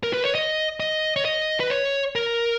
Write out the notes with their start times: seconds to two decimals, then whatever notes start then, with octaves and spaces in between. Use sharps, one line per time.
0.03 A#4
0.13 B4
0.24 C#5
0.35 D#5
0.80 D#5
1.16 C#5
1.25 D#5
1.60 B4
1.70 C#5
2.15 A#4